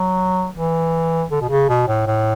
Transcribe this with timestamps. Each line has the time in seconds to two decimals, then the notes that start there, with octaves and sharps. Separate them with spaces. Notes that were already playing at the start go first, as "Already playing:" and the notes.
Already playing: F#3
0.55 E3
1.31 D3
1.41 B2
1.49 C#3
1.69 B2
1.88 A2
2.07 A2